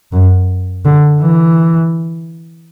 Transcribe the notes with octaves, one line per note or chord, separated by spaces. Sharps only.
F#2
D3
E3